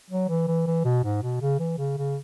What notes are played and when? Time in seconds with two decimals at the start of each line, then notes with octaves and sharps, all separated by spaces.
0.10 F#3
0.29 E3
0.47 E3
0.67 E3
0.85 B2
1.04 G#2
1.23 B2
1.41 C#3
1.59 E3
1.78 C#3
1.97 C#3